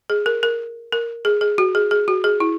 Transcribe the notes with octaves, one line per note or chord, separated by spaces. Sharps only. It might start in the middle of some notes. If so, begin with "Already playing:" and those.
G#4
A#4
A#4
A#4
G#4
G#4
F#4
G#4
G#4
F#4
G#4
E4